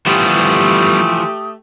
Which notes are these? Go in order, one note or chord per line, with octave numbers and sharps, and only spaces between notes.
E3 F3 G3 A3 B3 G4 D#6